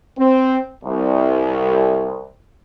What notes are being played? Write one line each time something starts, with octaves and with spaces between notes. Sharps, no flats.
C4
C2